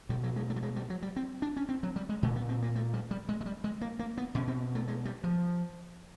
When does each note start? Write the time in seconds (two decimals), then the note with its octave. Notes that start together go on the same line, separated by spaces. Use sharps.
0.09 B2 G3
0.24 F#3
0.36 G#3
0.50 A3
0.56 G3
0.63 G#3
0.76 G3
0.90 F#3
1.02 G3
1.16 C4
1.42 D4
1.57 C#4
1.69 C4
1.83 F#3
1.96 G3
2.09 G#3
2.23 A#2 A3
2.36 B3
2.49 C4
2.62 A#3
2.76 A3
2.94 G3
3.11 G3
3.29 G#3
3.41 G#3
3.46 G3
3.64 G#3
3.81 A#3
3.99 A#3
4.18 B3
4.35 B2 C#4
4.48 C4
4.75 A3
4.88 G#3
5.05 G3
5.24 F3